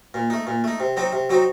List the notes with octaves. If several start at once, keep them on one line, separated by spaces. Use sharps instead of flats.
A#2
A3 D#4
A#2
A3 D#4
C3
F#3 C4 D#4 F#4
C3
F#3 C4 D#4 F#4